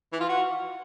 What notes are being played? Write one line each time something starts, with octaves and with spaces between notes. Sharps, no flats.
E3
F4
F#4